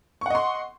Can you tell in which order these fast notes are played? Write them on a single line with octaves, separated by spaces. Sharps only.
C#6 F#5 D#5 C6